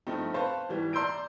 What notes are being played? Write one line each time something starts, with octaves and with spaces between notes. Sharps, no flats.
G2 F3 A3 C4 D#4
B4 C5 F5 A5 B5 C#6
G#1 E3 G3
D5 A#5 C6 E6 G6 D7